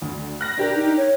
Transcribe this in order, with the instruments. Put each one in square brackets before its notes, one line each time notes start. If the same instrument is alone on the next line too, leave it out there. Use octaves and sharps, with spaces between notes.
[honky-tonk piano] D2
F#6 A#6
D4 G4 A#4
[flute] D#4
C#5